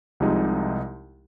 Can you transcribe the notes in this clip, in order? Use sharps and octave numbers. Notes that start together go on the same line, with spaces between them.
C2 C3 F3 G#3 D#4